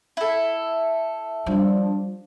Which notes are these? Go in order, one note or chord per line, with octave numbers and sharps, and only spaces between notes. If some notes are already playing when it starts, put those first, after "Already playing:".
E4 A4
F3 G3 D4